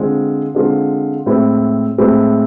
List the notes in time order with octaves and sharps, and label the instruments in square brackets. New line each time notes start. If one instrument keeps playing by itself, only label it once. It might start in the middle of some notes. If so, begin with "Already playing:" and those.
Already playing: [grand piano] D3 G#3 C4 F4
D3 G#3 C4 F4
A2 G#3 C4 E4
A2 G#3 C4 E4